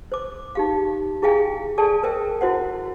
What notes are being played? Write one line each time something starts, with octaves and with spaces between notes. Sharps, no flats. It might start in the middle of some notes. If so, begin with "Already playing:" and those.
C5 D6
D#4 G4 F5
E4 G#4 E5 F5 G5 G#5
G#4 A4 D5 G#5 A5
A#4 C5 E5 G5
E4 F#4 C5 F#5